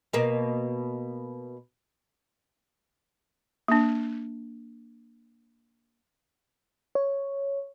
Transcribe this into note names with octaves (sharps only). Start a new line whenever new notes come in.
B2 A#3
A#3 D4
C#5